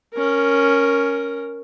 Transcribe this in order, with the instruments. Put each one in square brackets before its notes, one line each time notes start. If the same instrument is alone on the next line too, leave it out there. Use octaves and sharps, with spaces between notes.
[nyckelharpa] C#4 A#4